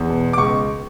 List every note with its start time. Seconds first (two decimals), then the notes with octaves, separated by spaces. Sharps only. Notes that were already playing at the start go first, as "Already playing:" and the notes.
Already playing: E2
0.09 B2
0.33 D6
0.38 C#2 C#6